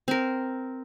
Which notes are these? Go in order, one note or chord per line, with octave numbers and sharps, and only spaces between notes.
C4 A#4